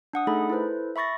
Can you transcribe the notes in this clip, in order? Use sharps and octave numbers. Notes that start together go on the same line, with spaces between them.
D4 F#5 D#6
A3 D#4 G#4 A4 B5
E4 A4 B4 C5
E5 B5 C#6 A6 A#6